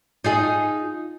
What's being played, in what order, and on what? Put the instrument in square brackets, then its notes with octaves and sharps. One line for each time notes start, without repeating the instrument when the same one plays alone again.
[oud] D#4 F4 G#4